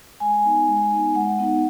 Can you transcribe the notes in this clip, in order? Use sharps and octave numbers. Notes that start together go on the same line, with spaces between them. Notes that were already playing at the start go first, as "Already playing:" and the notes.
G#3 G#5
B3 D#4
G#3
B3 D#4
G#3 F#5
B3 D#4